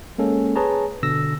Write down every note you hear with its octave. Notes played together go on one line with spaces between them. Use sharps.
G#3 A#3 C#4 A4
G#4 B4 C#5 A5 A#5
B2 D3 E6 A#6